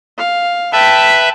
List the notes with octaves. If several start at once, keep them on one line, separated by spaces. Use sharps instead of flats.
F5
B4 E5 G5 A5